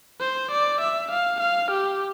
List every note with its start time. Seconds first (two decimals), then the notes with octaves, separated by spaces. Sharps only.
0.21 C5
0.51 D5
0.81 E5
1.11 F5
1.40 F5
1.71 G4